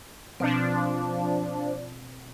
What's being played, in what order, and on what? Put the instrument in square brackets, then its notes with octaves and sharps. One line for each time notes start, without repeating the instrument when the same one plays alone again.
[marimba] B2 C4 [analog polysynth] F3 D4